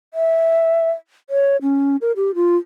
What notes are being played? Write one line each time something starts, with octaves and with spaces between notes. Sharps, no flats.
E5
C#5
C#4
A#4
G4
F4